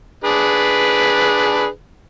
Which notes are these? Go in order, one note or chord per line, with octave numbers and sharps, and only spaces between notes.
D4 G#4 B4